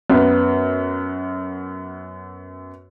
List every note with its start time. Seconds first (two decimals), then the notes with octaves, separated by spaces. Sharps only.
0.10 F#2 B3